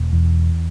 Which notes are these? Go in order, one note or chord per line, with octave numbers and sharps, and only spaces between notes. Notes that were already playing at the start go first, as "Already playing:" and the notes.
Already playing: E1
E2